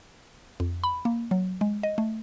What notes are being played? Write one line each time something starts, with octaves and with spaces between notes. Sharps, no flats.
F2
B5
A#3
F#3
G#3
D#5
A3